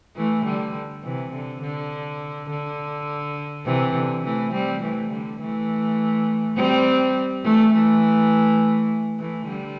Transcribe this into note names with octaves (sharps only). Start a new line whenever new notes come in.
E3 A3
D3 G3
C3 E3
D3
D3
D3
C3 E3
D3
E3 A3
G3 C4
E3 A3
D3 G3
E3 A3
G3 C4
E3 A3
E3 A3
E3 A3
D3 G3